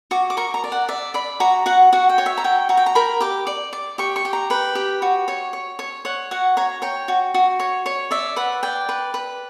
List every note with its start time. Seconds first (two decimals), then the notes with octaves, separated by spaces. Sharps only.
0.11 F#4 D6
0.30 D6
0.37 A#4 C#6
0.54 A#5
0.64 D5
0.72 F#5
0.88 D5 E5
1.14 D5 B5
1.40 F#4 A#5
1.66 F#4 F#5
1.93 F#4 F#5
2.09 G5
2.18 C#5
2.26 E5
2.38 A#5
2.44 F#4 G5
2.69 F#4 A#5
2.77 G5
2.86 A#5
2.95 A#4 B5
3.21 G4 D6
3.47 D5
3.73 D5
3.98 G4 C#6
4.16 C#6
4.25 G4
4.33 A#5
4.50 B4 G5
4.75 G4
5.02 F#4
5.28 C#5
5.53 C#5
5.79 C#5
6.05 C#5 F#5
6.31 F#4 F#5
6.57 C#5 A#5
6.82 C#5 G5
7.08 F#4
7.34 F#4
7.60 C#5
7.86 C#5
8.11 D5 E5
8.36 B4 F#5
8.63 D5 G5
8.89 B4
9.14 B4